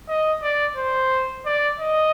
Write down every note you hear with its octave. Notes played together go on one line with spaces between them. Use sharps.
D#5
D5
C5
D5
D#5